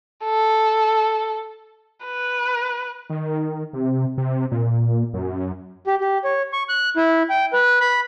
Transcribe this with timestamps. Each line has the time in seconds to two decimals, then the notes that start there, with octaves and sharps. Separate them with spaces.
0.25 A4
2.05 B4
3.10 D#3
3.73 C3
4.18 C3
4.52 A#2
5.14 F#2
5.87 G4
6.01 G4
6.24 C#5
6.53 C#6
6.69 F#6
6.97 E4
7.30 G5
7.53 B4
7.80 B5